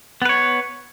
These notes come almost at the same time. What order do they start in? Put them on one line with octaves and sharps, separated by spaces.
B3 B4 C#5